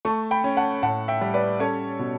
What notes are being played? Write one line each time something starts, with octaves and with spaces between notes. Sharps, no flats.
A3 A5 C#6
G5 B5
C#4
F#5 A5
A2 F#5 A5
E5 G5
G3
B4 D5
C#4 A4 C#5
B2